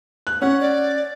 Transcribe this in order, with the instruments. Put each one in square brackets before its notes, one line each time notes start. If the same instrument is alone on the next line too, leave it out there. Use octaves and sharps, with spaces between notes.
[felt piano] F#6
[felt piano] C#4 [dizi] F#5
[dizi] D5